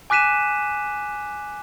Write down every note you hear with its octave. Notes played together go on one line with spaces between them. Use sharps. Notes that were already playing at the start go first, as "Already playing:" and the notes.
G#5 D6 F#6 B6 D#7 E7